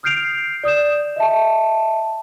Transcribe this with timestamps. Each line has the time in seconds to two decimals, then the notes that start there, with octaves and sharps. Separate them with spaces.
0.03 D#6 F6 G6 C7 D7 F7
0.64 D5 D#6 G6 E7
1.16 D#5 E5 A5